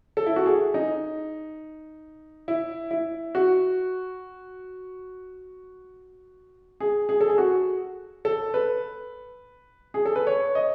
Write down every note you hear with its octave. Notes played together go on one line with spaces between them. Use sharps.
A4
E4
F#4
G#4
D#4
E4
E4
F#4
G#4
G#4
A4
G#4
F#4
A4
B4
G#4
A4
B4
C#5
D#5